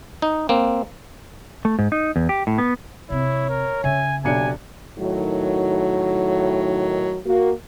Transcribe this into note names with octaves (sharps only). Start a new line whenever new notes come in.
D#4
A#3 C4
A3
G#2
D#4
E2
G4
A2
B3
C3 C4 E4 C#5
A#4
C#3 E5 G#5
B1 C3 D4 G#5 C#7
A2 D#3 F#3
A#3 F#4